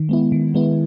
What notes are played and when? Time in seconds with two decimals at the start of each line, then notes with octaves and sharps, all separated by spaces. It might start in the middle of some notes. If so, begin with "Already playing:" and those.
Already playing: D#3
0.09 G#3 B3 E4
0.32 D#3
0.54 G#3 B3 E4